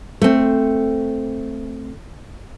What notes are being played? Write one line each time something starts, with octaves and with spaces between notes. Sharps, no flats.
A3 C4